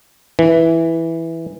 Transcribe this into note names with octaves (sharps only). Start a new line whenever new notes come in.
E3